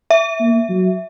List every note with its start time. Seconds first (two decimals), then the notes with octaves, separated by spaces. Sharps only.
0.10 E5
0.40 A#3
0.69 F#3